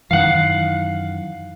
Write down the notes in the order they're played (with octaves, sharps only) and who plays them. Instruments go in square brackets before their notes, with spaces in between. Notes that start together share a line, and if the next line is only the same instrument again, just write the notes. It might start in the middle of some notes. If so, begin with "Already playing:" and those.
[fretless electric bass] F#2 D#3 E3 [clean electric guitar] F5 F#5